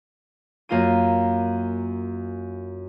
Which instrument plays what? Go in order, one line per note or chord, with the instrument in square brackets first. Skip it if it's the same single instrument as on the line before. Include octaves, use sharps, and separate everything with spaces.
[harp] F#2 A#3 F4 A#5 D#7